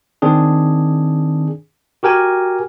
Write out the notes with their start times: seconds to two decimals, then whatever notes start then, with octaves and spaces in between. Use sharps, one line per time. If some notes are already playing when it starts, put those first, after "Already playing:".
0.22 D#3 C4 D4 G#4
2.03 F#4 G4 A#4 G5 G#5